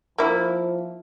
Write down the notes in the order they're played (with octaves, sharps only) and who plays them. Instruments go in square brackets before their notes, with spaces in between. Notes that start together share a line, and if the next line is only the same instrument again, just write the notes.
[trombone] F3 [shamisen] A#3 E4